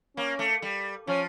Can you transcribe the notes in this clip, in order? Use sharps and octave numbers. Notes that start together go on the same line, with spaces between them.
A#3 C#4
A3
G3
F3 C#4